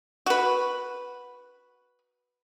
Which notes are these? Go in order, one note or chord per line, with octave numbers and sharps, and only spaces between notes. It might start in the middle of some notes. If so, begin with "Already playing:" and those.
F#4 B4